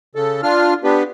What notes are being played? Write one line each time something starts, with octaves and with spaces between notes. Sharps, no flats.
C#3 A4
D4 F4 F6
B3 D4 G4 B4